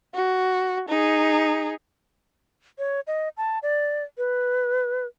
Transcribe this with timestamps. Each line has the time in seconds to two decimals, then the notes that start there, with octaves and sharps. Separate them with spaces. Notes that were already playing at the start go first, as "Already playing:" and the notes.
0.15 F#4
0.89 D#4 G#4
2.79 C#5
3.07 D#5
3.37 A5
3.63 D5
4.18 B4